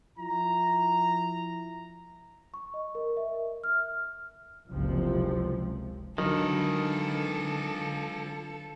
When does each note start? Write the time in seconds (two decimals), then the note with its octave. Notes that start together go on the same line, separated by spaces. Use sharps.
0.17 F3 E4 A#5
2.54 C#6
2.74 D#5
2.95 A#4
3.17 E5
3.64 F6
4.69 F#1 C#2 C3 F3
6.18 D3 D#3 F#3 F4 A4 B4